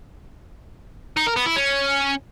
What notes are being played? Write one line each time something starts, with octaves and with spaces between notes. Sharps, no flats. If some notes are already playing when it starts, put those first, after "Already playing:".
D#4
A#4
B3
E4
C#4